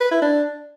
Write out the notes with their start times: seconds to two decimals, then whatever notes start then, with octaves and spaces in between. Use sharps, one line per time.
0.01 B4
0.11 E4
0.22 D4